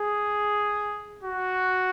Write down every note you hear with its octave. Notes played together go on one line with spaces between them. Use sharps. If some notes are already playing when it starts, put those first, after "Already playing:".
Already playing: G#4
F#4